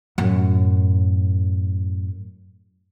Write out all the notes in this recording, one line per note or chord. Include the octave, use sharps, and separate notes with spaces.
F#2 A2